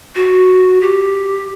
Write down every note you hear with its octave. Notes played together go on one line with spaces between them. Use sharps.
F#4
G4